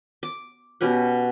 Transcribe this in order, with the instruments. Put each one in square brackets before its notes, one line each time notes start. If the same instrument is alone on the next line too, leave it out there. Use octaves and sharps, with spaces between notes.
[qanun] D6
B2 C#4 G4 F#5